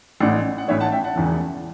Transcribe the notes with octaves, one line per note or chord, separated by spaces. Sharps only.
A1 A2 E3 D5 F#5
F#5
A1 A2 E3 C#5 E5
F#5 A5
E5 G5
F#5 A5
E1 E2 C#3 E3